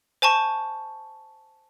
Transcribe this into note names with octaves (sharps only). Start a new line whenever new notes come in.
C5 G#5 A5 C#6